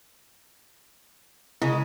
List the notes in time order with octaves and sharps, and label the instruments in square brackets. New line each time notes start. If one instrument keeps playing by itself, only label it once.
[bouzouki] C#3 G#3 [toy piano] E4